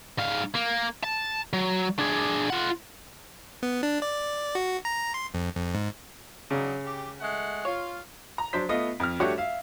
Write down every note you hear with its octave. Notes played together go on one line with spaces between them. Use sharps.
G#2 F5
A#3
A5
F#3
D4 G#4
F4 F#5
B3
D4
D5
F#4
A#5
C6
F2
F2
G#2
C#3 F#3 D4 D#4
G4
G#3 A3 F#5
F4 C#5
A#5
F#3 D4 C5 B6
A3 B3 F4 D#5
F2 F6
G3 A3 D4 F#4 G4 C#5
E5 F5